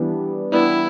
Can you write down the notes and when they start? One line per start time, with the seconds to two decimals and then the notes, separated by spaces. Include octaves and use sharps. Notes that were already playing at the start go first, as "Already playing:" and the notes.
Already playing: E3 G3 B3 D4
0.52 E3 G3 B3 D4 E4